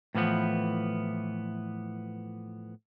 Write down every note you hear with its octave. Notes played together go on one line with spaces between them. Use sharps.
A2 E3 F3 B3